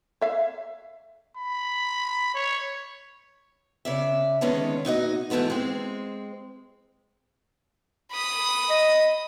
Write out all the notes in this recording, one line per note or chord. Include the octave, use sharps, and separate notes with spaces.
C#5 E5 F5
B5
C#5
C#3 D5 E5
D3 D#3 G#3 B3 C#4
A#2 D#4 F#4 D#5
G#2 E3 A3 B3 F#4
G#3 C4
B5 D#6
D#5